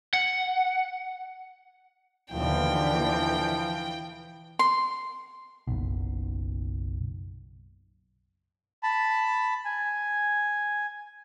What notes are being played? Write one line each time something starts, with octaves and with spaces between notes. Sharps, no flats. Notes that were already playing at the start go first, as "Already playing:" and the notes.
F#5
D#2 B2 D3 E3 F3 G5
C6
F#1 B1
A5 B5
G#5